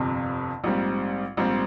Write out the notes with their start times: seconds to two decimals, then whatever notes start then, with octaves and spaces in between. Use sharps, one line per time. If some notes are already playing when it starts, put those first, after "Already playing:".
Already playing: G1 F2 C3
0.64 A#1 G#2 G3 C4
1.37 A#1 G#2 G3 C4